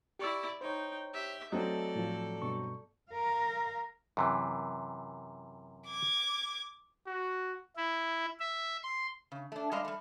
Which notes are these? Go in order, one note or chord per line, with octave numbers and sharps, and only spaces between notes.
E4 G4 D5 C#6 E6
D#4 C5 C#5 G5
G4 E5
F#3 A3 C4 A4 D5 D#5
A2 F3
G2 B2 C#6
A#4 F5
F#2 C3 E3
D6 G#6
F#4
E4
E5
C6
C#3
A3 D4
G3 G#3 C#4 D4 D#5 F5
G3 A3